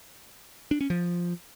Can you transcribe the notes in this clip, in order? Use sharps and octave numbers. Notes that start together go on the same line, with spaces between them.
D4
C#4
F3